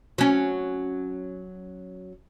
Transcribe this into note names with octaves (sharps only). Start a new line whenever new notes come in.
F#3 C#4